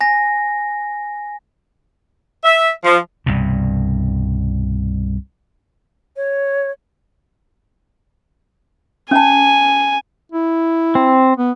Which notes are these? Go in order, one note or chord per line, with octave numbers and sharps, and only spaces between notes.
G#5 A#6
E5
F3
C2 G2 B2
C#5
C#4 G#5 A5
E4
C4
B3